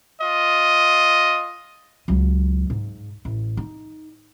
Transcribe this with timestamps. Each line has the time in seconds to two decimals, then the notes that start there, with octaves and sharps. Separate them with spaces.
0.21 F4 D#5
2.08 C#2 F#3
2.70 G#2
3.25 A1
3.57 D#4